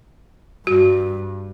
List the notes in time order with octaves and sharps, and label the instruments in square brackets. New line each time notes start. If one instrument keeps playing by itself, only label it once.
[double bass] G2 [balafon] F#4